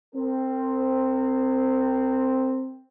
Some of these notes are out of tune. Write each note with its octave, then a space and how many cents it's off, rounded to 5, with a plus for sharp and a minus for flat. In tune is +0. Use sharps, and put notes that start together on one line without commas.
C4 +0 A#4 -40